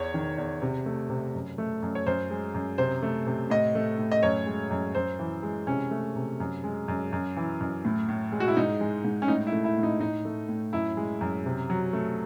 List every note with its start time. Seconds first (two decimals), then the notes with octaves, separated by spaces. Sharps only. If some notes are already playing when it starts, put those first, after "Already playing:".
Already playing: E2 C#5
0.14 D#3
0.38 E2
0.62 C3
0.86 A3
1.10 C3
1.35 F#2
1.58 A3
1.83 F#2
1.95 C#5
2.06 F#2 C5
2.30 G#3
2.54 F#2
2.78 C3 C5
3.03 A3
3.27 C3
3.50 A2 D#5
3.75 A3
3.98 A2
4.12 D#5
4.23 F#2 C#5
4.46 G#3
4.71 F#2
4.95 F#2 C5
5.19 E3
5.43 G#3
5.67 C3 C#4
5.91 A3
6.16 C3
6.40 F#2
6.64 G#3
6.88 F#2
7.12 F#2
7.37 E3
7.61 F#2
7.85 A2
8.09 A2
8.32 G#3
8.40 F#4
8.48 E4
8.57 G#2 D#4
8.81 G#3
9.05 G#2
9.22 C#4
9.28 A2 D#4
9.47 E4
9.52 A3
9.64 E4
9.77 A2
9.83 D#4
10.00 A2 D#4
10.25 A3
10.49 A2
10.73 F#2 E4
10.97 G#3
11.21 F#2
11.46 C3
11.70 F#3
11.93 A3